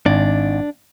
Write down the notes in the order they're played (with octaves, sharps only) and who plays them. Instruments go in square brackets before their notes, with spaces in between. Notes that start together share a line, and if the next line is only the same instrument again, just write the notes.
[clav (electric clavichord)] G#1 [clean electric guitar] D4